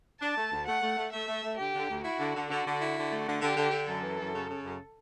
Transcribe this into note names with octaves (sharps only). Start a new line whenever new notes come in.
D4 A5
A3
D2
A3 F#5
A3
A3
A3 E5
A3
A3
D3 G4
D3
D2
E4 F#4
D3
D3
D3 F#4
D3
E4
D3
A3
D3
D3 G4
D3
D3
F#2 A4
E3
F#2
C#3
C#3
F#2